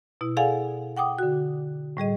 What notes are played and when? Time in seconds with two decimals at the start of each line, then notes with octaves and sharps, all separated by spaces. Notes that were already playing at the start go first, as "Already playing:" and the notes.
0.21 B2 E4
0.37 G#4 A4 D5 F5 F#5 G#5
0.97 F#5 G5 D6 D#6
1.19 D3 F#4
1.97 A2 G3 G#4 D#5